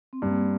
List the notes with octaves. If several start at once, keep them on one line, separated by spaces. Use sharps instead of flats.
C4
G2 A#3
A#3